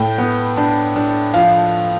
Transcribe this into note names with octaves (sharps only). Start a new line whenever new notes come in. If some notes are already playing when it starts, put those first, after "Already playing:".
Already playing: A2 G5
B3
D4
D4
F3 F5